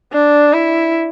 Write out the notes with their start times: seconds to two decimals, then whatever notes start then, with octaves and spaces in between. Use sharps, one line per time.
0.13 D4
0.53 E4